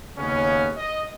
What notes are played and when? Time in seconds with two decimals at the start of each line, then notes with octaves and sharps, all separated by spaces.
0.18 D#2 C#3 B3 C#4
0.75 D#5